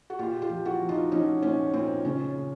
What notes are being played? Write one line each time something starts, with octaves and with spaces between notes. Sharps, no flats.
F#4
A#2 F4 G4
F4 G4
F3
E4 F#4
F3
D#4 F4
F3 C#4 D#4
A#2 C#4
A#2 C4
C#3 C#4
C#3